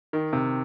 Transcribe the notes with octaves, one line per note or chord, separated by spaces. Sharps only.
D#3
C3